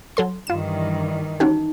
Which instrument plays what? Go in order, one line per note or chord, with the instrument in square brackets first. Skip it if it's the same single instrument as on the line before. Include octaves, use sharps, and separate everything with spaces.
[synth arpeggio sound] F#3 A4 C6
[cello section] G2 D#3 E3 [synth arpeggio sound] F4 E7
[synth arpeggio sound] C#4 F#4 G4 [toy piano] D#4